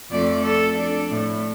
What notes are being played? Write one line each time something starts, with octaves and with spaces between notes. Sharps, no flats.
F2 A3 D5
A4
D4
A2